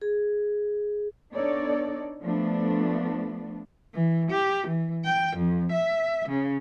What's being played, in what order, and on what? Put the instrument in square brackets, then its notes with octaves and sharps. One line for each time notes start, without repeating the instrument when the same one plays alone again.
[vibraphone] G#4
[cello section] B3 D4 D#4 A4 C#5 D5
F3 A3 B3 D4
[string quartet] E3
G4
E3
G5
F2
E5
C#3